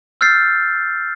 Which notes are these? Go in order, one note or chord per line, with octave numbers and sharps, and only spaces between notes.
E6 F6 G6 A6 C7